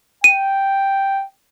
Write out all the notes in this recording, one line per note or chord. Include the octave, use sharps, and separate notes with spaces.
G5 D#7